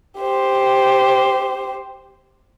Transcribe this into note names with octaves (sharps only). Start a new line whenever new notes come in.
G4 C5